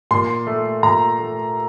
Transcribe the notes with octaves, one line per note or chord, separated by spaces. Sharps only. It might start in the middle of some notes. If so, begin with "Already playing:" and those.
A#2 C6
A3
A#2 A#5
A3